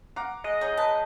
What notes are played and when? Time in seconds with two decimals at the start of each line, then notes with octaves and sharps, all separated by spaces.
0.16 F5 F#5 A#5 D6
0.44 G#3 D#5
0.61 D#4 G#4 C#5 A#5
0.77 B4 A5 B5